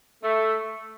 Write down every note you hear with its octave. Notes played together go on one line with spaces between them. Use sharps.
A3